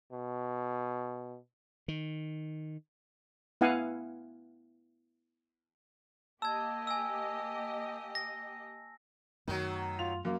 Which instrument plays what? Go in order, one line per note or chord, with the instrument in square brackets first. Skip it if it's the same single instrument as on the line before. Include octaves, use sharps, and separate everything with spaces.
[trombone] B2
[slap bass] D#3
[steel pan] B3 E4 F5 F#5 G#5
[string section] A#3 G4 D#5 [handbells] A5 [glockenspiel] E6 G#6
[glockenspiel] G#5 E6
A#6
[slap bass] F#2 A3 [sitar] D#3 F#3
[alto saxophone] F4 [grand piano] F7
[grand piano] F#2 [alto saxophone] A#3